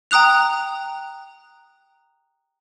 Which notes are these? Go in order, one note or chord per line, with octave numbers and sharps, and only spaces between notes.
G5 A#5 D#6 F#6 F7